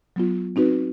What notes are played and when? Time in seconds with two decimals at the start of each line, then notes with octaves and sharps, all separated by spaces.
0.16 F#3 B3 F4
0.56 C4 D#4 F#4 B4